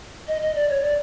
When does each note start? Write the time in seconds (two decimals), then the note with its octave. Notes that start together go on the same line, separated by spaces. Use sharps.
0.27 D#5
0.42 D#5
0.55 D5
0.69 C#5
0.82 D5